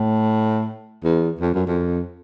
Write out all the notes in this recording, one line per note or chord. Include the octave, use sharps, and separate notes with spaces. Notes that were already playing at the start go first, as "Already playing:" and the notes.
Already playing: A2
E2
F2
F#2
F2